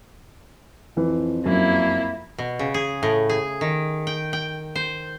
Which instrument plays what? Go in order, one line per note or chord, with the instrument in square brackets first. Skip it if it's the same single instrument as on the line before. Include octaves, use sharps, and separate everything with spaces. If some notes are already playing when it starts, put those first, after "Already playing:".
[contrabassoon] F2 [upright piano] E3
[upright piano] F#2 [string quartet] A#3 E4
[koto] B2
C#3
G#4
A2
G#4
D#3
G5
G5
C5